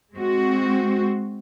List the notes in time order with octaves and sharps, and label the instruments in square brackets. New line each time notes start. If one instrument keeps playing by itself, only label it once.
[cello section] G#3 C4 F#4